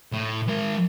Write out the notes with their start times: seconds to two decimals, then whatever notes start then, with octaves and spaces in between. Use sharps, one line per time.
0.12 A2
0.48 G#3 A#4